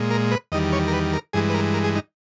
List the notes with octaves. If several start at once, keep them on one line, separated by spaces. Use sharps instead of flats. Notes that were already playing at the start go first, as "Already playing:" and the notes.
Already playing: A#2 G#3
A#4
B4
E2 D#3 G3 D#5
C#5
A#4
B4
A#4
G2 E3 G#3 G#4
B4
A#4
A#4
G#4
D#4